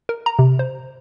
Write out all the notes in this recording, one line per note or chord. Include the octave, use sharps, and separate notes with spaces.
A#4
A#5
C3
C5